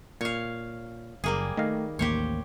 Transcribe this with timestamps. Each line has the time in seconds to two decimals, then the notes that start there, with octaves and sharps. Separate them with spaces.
0.21 A#2 C#5 F5
1.24 F#1 G3 A#3 G#4
1.57 D#3 A3 D#5 F5
1.99 A1 D#2 A#3 G4 C5 C#5